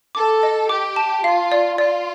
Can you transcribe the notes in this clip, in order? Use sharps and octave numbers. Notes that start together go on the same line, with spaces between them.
A4 D6
D#5
G4 D6
A5
F4 F5
D5
F4 D5